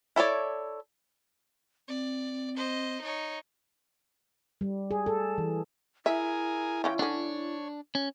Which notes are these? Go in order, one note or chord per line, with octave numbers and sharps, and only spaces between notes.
E4 A4 C#5 D5
C4 D5
C5 D#5
D#4 C#5
G3
G#4
A4
E3
E4 G#4 A#4 E5 G#5
E3 C#4 F4 G5
D3 C#4 D4 C#5
C#4